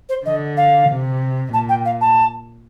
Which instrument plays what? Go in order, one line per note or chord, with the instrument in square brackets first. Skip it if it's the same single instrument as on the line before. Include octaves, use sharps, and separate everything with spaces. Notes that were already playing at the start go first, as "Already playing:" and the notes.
[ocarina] C5
[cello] D3 [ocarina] D#5
[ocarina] F5
[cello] C3
[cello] A#2 [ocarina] A5
[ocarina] G5
F5
A5